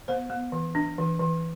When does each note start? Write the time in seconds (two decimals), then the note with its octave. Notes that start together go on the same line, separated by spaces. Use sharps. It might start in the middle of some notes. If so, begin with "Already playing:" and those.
0.08 B3 C5
0.30 B3
0.52 E3
0.75 D4
0.98 E3
1.19 E3